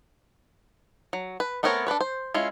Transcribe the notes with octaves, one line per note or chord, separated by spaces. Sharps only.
F#3
B4
A3 B3 C4 A#4 C#5
D4 A4 B4 C#5
C5
G#3 C#4 E4 F4